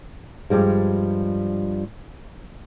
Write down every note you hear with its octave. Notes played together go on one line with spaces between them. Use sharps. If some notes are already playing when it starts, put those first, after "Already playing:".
G2 F3 G3 G#3